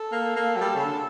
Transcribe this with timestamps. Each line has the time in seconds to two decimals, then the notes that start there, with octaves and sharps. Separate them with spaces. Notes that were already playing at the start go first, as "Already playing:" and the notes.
Already playing: A4
0.12 A#3
0.36 A#3
0.56 F#3
0.61 G3
0.75 C#3
0.85 D3